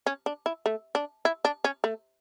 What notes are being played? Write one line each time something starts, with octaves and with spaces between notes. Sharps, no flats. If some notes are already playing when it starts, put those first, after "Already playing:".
C#4
D4
E4
A3
D4
E4
D4
C#4
A3